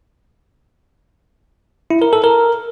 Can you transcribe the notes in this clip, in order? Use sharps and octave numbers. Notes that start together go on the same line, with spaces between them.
E4
A#4
A4
A#4